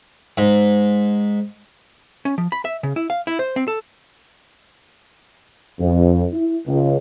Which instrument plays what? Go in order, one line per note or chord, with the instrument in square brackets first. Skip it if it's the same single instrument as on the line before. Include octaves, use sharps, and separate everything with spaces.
[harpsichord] G#2
[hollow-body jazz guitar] C#4
F3
B5
E5
C#3
E4
F5
E4
C5
C4
A4
[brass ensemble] F2
E4
C#2